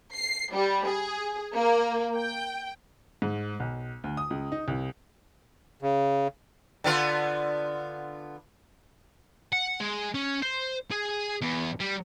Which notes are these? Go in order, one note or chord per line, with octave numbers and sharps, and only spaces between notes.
C7
G3
G#4
A#3
G5
G#2
B1
D2
D#6
C#2
D#4
C2
C#3
D3 B3 F4
F#5
G#3
C#4
C5
G#4
E2
G3